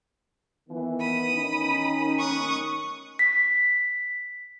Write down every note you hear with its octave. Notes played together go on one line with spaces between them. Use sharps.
D#3 E3 B3
B5 D#6
D#3 C#4 D#4
C#6 D#6 F#6
B6